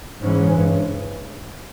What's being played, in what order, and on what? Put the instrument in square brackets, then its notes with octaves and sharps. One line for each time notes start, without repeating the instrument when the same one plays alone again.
[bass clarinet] G#2 [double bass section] C#3 E3 G#3 C#4
[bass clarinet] G#2
G2